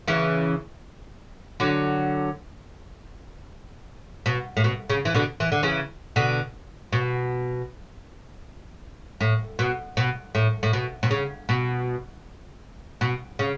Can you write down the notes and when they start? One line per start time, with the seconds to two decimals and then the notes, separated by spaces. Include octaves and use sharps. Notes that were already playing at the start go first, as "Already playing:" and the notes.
0.08 C#3 E3
1.60 D3 F#3
4.26 B2
4.57 A2
4.64 B2
4.90 C#3
5.05 E3
5.14 B2 D3
5.40 E3
5.52 D3
5.63 C#3 E3
6.16 B2 D3
6.93 B2
9.21 A2
9.59 B2
9.97 B2
10.35 A2
10.63 A2
10.73 B2
11.03 B2
11.11 C#3
11.49 B2
13.01 B2
13.39 C#3